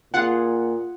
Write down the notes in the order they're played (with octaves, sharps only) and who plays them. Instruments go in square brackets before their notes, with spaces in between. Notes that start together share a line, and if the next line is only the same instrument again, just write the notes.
[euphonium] A#2 [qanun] F4 G#4 [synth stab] F#5